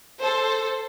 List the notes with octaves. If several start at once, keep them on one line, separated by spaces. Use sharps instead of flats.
A4 C5